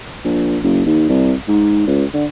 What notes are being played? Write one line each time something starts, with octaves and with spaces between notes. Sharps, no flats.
A#1
F#1
D#2
C2
G#2
C#2
D3